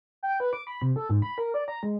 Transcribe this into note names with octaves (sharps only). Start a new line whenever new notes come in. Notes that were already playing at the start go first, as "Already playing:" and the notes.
G5
B4
D6
B5
C3
A4
G#2
B5
A#4
D5
A#5
G#3